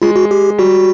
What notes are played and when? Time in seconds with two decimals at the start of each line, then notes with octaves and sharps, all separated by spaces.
0.02 G#3 F4
0.16 F#4
0.31 G4
0.58 G3 F#4